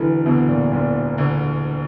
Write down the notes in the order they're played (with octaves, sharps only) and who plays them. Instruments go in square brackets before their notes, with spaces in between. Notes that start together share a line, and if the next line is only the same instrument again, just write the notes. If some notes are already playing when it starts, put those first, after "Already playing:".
Already playing: [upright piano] E1 [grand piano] D3 E3
[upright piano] D2 D3 [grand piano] B2
[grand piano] A#2
[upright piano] E1 [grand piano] A#2
[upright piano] D2 D3